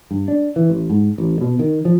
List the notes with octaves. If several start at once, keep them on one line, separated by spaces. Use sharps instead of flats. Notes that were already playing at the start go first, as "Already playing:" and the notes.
G2
D4
E3
A1
G#2
A1
B2
D#3
F3